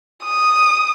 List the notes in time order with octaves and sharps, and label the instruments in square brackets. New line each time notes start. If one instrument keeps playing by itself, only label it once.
[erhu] D#6